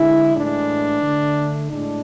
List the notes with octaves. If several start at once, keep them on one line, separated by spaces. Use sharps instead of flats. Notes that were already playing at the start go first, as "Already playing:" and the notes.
Already playing: D3 G#3 E4
A2 E3 G#3 D4
D3 A3
A2 G#3 D4